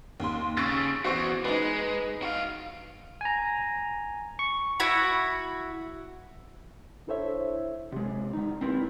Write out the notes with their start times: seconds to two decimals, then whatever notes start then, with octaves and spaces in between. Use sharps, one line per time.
0.20 D#2 C6
0.57 C#3 C#6 E6 A6
1.05 E2 F#4 C5 C#6
1.45 G#3 D#4 B4
2.22 F#4 F5
3.21 G#5 A#5
4.39 C#6
4.80 E4 F#4 B5
7.07 D4 E4 A4 C5 C#5 E5
7.92 C3 G#3
8.33 D3 D#4
8.61 C4 E4 A#4 B4